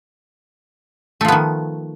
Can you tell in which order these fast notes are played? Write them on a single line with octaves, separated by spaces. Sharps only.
A3 F3 B3 D#3